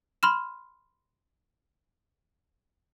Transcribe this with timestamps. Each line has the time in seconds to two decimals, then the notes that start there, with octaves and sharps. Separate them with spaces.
0.23 B5 C6 F6 E7